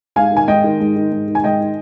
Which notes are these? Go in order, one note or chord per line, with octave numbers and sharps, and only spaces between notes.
G#2 F5 G#5
D#3 G#5
G#2 D#5 G5
D#3
G#2
D#3
G#2
D#3
G#5
G#2 D#5 G5
D#3